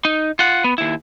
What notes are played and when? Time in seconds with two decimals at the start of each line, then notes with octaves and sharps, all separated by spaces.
0.05 D#4
0.39 F4 F#5
0.64 B3
0.78 D#2 E4